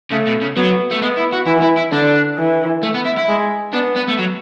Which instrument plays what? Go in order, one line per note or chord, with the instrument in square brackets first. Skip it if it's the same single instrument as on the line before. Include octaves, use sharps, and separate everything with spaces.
[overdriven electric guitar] C#3 [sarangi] A3
[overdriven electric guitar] B2
C#3
[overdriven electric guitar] F#3 [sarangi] B3
[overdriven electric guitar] A3
[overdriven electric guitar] G#3 [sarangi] B3
[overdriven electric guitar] E4
F#4
[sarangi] E3 [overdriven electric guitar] E4
[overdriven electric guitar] E4
E4
[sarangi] D3 [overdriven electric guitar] D4
[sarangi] E3
[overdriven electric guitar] A3
B3
E4
E4
[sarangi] G#3
[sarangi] B3 [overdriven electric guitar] D4
[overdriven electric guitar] B3
A3
F#3